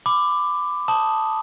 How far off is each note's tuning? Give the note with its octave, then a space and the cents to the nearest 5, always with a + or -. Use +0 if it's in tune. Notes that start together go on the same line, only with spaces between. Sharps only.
B5 +25 D6 +10
A5 +0 D#6 +0